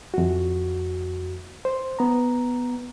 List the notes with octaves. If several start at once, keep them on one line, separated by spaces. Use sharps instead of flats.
F2 F#4
C5
B3 A#5